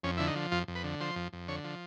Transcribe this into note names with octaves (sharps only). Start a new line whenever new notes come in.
F2 C#4
D3 E4
D#4
F3
F2 F4
F2
B4
D3
F3 C5
F2
F2
D3 C#5
F3